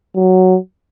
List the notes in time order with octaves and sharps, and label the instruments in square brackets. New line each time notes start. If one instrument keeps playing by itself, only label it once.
[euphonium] F#3